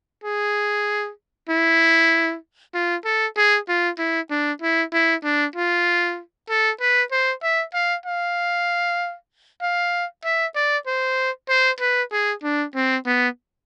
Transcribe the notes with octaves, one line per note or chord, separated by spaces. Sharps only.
G#4
E4
F4
A4
G#4
F4
E4
D4
E4
E4
D4
F4
A4
B4
C5
E5
F5
F5
F5
E5
D5
C5
C5
B4
G#4
D4
C4
B3